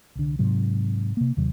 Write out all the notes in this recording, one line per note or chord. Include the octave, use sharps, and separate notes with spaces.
C2 D3
G#2 C3 F#3
C3 A#3
D#2 C3 D#3 F#3